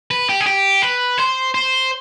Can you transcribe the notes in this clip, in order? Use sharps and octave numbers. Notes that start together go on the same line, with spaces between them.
B4
G4
G#4
G4
B4
C5
C5